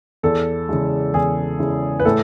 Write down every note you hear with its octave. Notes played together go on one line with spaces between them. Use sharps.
E2 A4
C#3 E3 G#3
E2 G#4
C#3 E3 G#3
B4
A2 A4